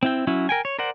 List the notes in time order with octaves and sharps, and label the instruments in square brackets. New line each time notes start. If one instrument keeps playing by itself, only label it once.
[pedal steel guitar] C4 E4 G5
F#3 C#4 E4
A#4 G5 G#5
C#5
A#4 C5 D5 F#5